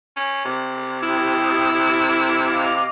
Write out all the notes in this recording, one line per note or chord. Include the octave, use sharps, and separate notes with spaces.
C#4
C3
E4 G4 D#6
D#5 F5 D6